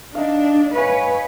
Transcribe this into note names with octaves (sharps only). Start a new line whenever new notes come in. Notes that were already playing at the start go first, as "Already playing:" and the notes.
D4 D#4 F5
B4 C#5 F5 G#5